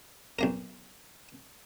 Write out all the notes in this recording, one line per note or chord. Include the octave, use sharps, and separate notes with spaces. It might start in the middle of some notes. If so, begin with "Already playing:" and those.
B1 A#3 A#4